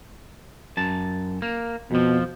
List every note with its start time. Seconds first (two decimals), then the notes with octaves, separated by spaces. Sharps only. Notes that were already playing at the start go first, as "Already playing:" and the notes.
0.77 F#2 A5
1.42 A#3
1.91 F2 B2 F3